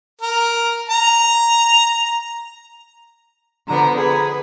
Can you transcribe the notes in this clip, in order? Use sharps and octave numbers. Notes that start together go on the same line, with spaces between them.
A#4
A#5
D3 F3 B3 A#5
G#4 B4